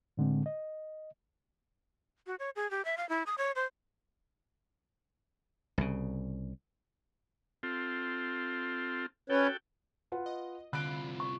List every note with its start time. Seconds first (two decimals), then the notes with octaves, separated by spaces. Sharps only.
0.17 A2 D3 G#3 C4
0.46 D#5
2.27 F#4
2.39 C#5
2.56 G#4
2.71 G4
2.85 E5
2.97 F5
3.09 E4
3.26 D#6
3.38 C#5
3.56 C5
5.78 C2 C#3
7.63 C4 F4 A4
9.30 C#4 F#4 A4 B4 C#5 G5
10.12 F4 B4 F#5
10.26 D#5
10.73 C2 D3 F4 B5 F#6 D7
11.20 C#6